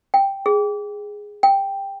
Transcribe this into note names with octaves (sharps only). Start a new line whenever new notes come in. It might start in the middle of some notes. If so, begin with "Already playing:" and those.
G5
G#4
G5